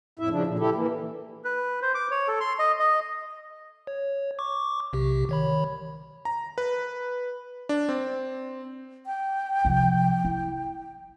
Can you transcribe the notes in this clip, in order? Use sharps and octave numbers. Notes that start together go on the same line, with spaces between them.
F2 A2 E4 E5
C#3 F3 D4
A#2 D3
E4 G4 A4
E3 A#3
B4
C5
D6
C#5
A4
C6
D#5
D#5
C#5
C#6 D6
B1 C3 G4
D#3 C#5 B5
A#5
B4
D4
C4
G5
C3 F3
E4